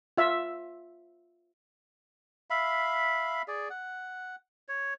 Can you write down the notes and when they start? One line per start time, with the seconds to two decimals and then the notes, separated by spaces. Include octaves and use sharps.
0.17 F4 E5
2.50 E5 F5 B5
3.48 G#4 D5
3.70 F#5
4.69 C#5